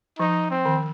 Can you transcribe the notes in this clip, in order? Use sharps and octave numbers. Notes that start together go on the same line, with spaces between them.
F3 D#4
C4
D#3